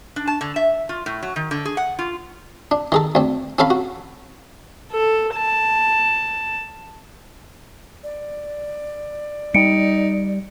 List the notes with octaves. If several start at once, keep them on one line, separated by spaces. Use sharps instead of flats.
D4
A5
D3
E5
F4
A2
F#3
D#3
D3
G#4
F#5
F4
D4
D#3 G#4 A4
D2 C4
C4 C#4 A4 F5 B5
F#4
A4
A5
D5
G3 D#4 C#7 D7